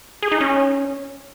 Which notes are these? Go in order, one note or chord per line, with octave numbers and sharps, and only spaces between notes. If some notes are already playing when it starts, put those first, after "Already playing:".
G#4
D#4
C#4